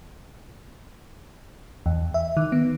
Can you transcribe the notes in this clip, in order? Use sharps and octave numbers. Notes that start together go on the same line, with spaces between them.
E2
E5
D#3
B3